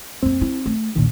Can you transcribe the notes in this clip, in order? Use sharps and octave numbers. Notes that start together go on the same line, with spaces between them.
F2 A#3 C4
E4
A3
A#1 E2 A#2 D#3